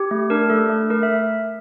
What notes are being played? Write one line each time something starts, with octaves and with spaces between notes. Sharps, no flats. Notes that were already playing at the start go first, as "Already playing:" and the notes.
Already playing: G4
A3
D4 A#4
A3 A4
A3
A3 A#4
E5